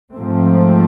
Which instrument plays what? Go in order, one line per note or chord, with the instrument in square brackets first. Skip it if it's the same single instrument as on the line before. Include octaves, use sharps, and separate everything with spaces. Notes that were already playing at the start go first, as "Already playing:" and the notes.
[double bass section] G#2 F3 A3 C4